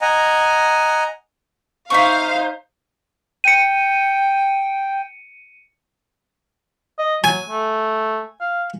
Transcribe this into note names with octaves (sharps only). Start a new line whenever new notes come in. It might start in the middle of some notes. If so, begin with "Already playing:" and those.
D#5 F#5 G#5 A#5
D#4 C5 E5 F5 C6 C#6
G5 C#7 D#7
D#5
F#3 G#5
A3
F5